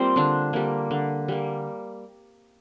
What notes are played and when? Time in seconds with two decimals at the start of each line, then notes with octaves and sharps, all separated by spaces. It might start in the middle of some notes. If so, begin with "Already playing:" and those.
Already playing: G3 A#3 C4 F4 C5 F5
0.16 D3 D4
0.53 G3 A#3
0.91 D3
1.28 G3 A#3